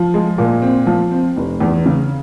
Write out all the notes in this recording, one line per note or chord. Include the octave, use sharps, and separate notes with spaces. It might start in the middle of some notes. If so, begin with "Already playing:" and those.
Already playing: F3
G#3
A#2
C4
F3
C4
F1
E2
C#3